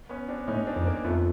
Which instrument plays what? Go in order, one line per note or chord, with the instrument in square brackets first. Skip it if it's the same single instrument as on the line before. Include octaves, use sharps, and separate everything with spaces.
[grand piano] B3 C#4
C4 D4
[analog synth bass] A2 [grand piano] C#4 D#4
[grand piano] C4 D4
[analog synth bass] F2
[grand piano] A#3 C4
[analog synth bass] F2 [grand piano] A3 B3